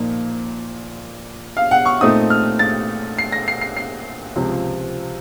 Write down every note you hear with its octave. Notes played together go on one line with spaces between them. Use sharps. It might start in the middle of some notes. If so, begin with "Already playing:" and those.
Already playing: A#2 F3 A#3 D#4
F5
F#5
C#6
A#2 A3 C4 D#4 D#6
F6
A6
C7
A#6
C7
C7
C7
C#2 C3 F3 C4